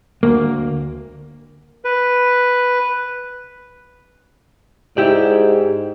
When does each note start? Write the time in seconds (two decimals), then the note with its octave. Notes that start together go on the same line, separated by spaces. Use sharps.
0.23 D2 A#3
1.85 B4
4.97 G#2 E4 G4 D5